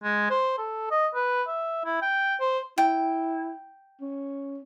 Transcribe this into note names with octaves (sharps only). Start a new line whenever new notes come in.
G#3
C5
A4
D#5
B4
E5
E4
G5
C5
E4 G5
C#4